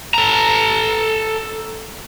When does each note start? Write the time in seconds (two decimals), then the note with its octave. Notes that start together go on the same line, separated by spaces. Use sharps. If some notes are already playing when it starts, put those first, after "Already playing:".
0.14 A4 A#5